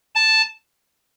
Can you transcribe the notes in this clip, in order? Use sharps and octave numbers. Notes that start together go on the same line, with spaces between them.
A5